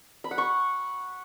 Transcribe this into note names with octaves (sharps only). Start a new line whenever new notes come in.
B5
F#5
C#6